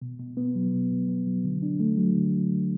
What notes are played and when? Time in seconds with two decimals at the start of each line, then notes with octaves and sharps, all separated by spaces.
0.02 B2
0.19 B2
0.37 B3
0.55 F#3
0.73 B2
0.91 B2
1.09 B3
1.27 F#3
1.44 D3
1.62 D4
1.80 A3
1.97 F#3
2.16 D3